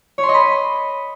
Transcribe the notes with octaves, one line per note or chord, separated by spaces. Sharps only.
C#5
C6
D#5
B5